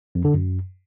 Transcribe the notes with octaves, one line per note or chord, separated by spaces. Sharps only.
F2
D3
F#2